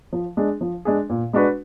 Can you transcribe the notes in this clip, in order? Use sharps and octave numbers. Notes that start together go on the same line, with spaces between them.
F3
G#3 D4 G#4
F3
G#3 D4 G#4
A#2
G#3 D4 F#4 B4